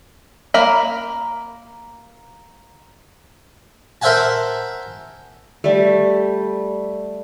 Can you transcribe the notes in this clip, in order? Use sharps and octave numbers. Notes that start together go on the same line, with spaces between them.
A#3 A#4 A#5 B5
A#4 C5 E5 F#5 G#5 A5
G3 A3